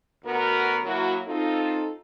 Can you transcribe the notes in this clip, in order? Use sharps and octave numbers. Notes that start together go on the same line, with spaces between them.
D2 B3 F#4 A#4
F#3 A#3 E4 F#4
C4 D#4 F4 A4